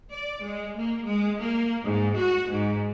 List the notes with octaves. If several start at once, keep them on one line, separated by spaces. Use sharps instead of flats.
D5
G#3
A#3
G#3
A#3
G#2
F#4
G#2